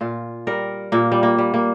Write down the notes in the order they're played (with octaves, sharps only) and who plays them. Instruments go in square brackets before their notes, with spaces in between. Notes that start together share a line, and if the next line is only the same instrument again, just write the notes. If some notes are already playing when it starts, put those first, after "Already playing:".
[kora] A#2 F4
G3 A#4
A#2 A#3
G3
A#3
G3
A#3